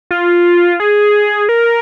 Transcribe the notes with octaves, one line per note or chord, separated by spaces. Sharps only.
F4
G#4
A#4